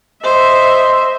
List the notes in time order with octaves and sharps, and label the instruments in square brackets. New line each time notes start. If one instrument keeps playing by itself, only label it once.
[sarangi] C5 [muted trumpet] D#5 [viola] E5